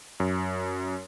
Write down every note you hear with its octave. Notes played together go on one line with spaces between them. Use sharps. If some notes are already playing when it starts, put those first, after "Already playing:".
F#2